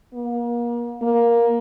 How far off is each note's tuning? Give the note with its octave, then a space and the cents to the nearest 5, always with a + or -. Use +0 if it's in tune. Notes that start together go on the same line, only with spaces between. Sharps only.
A#3 +35
A#3 +10